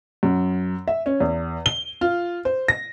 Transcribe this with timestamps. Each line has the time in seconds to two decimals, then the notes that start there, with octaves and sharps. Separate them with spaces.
0.23 F#2
0.88 E5
1.06 C#4
1.20 E2
1.66 G7
2.01 F4
2.45 C5
2.68 A#6